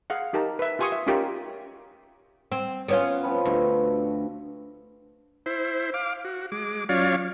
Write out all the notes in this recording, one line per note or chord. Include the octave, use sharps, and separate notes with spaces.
G#4 F5 F#5
D#4 G4 A#4 A5
B4 E5
F4 G4 G#5 C6 C#6 D#6
E5
C#4 D#4 F4 G4 A#4
C4
B3 C#4 F4
F3 C4 B4
D2 B2 A4 C#6
E4 C5
F5 D6
F#4
G#3 D6
F#3 C#4 F4 C#5 D5 F5